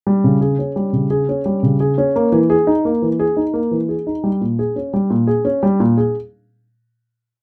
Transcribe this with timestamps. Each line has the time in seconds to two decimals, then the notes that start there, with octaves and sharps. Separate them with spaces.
0.07 G3
0.24 C#3
0.41 G#4
0.59 C#4
0.76 G3
0.93 C#3
1.10 G#4
1.29 C#4
1.46 G3
1.63 C#3
1.80 G#4
1.98 C#4
2.16 A#3
2.32 E3
2.50 G#4
2.67 D#4
2.85 A#3
3.02 E3
3.19 G#4
3.37 D#4
3.54 A#3
3.71 E3
3.89 G#4
4.07 D#4
4.24 G3
4.41 A#2
4.59 G#4
4.76 C#4
4.94 G3
5.10 A#2
5.27 G#4
5.45 C#4
5.63 G3
5.80 A#2
5.97 G#4